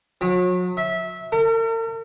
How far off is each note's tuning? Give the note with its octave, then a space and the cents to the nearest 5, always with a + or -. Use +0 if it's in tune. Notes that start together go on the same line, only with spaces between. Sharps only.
F#3 -35
E5 -20
A#4 -45